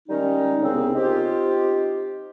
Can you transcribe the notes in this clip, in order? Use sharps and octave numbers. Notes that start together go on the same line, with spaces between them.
D#3 G3 G#3 C#4 D#4
C2 C#3 B3 C4
C4 D#4 F4 G4